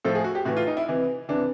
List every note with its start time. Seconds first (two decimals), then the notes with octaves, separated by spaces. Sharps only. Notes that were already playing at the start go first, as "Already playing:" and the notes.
0.05 A2 F3 A4
0.15 G#4
0.24 F#4
0.35 G4
0.45 A2 E3 F#4
0.57 F4
0.67 D#4
0.77 E4
0.88 C3 E3
1.29 C3 E3 D4